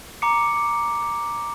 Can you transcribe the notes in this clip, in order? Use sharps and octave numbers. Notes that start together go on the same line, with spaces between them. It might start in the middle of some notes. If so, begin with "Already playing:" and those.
A#5 D6 C#7